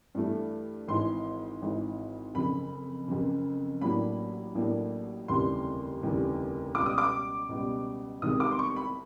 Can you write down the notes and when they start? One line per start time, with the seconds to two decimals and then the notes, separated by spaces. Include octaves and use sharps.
0.15 G2 E3 A3
0.88 G#1 G#2 E3 C6
1.62 G#1 G#2 E3
2.34 F#1 F2 C#3 B5
3.08 F#1 F2 C#3
3.81 A1 A2 F#3 A#3 D4 B5
4.55 A1 A2 F#3 A#3 D4
5.28 F1 D#2 C#3 E3 G3 C6
6.02 F1 D#2 C#3 E3 G3
6.74 C#2 B2 G3 D6
6.86 D#6
6.98 D6
7.49 C#2 B2 G3
8.22 C2 C3 D#3 G#3 D#6
8.40 D6
8.51 C6
8.59 C#6
8.76 B5